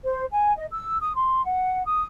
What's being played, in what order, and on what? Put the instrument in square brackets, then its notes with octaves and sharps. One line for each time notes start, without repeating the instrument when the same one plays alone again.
[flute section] C5
G#5
D#5
E6
D#6
C6
F#5
D#6